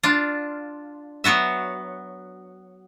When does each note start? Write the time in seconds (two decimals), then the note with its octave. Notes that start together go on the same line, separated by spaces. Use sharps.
0.03 D4 F4
1.24 F#3 B3 F#4 E5